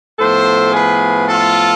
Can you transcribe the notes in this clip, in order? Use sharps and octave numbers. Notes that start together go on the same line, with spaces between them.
A2 F3 B3 A4 C5
G#4 B4
F4 A4